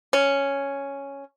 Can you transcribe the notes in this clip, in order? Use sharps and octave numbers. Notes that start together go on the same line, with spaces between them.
C#4